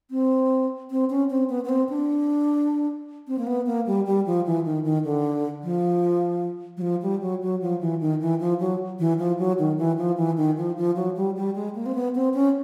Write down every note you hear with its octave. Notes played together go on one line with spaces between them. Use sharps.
C4
C4
C#4
C4
B3
B3
C4
D4
C4
A#3
B3
A#3
G3
G3
F3
E3
D#3
D#3
D3
F3
F#3
F3
G3
F#3
F#3
F3
E3
D#3
E3
F3
F#3
E3
F3
F#3
D#3
E3
F3
E3
D#3
F3
F3
F#3
G3
G3
G#3
A#3
C4
B3
C4
C#4